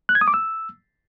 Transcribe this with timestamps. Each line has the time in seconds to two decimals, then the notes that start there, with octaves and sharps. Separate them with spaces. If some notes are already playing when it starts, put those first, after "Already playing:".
0.09 F#6
0.15 G#6
0.21 D#6
0.28 D6
0.34 E6